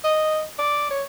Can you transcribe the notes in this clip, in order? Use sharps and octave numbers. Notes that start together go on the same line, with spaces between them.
D#5
D5
C#5